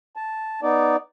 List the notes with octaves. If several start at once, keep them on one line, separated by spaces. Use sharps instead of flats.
A5
B3 D#4 D5